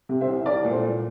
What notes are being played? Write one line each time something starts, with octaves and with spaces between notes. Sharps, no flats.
C3
C5 E5
C2
C2 A#4 D5
A#2
A4 C5
A#2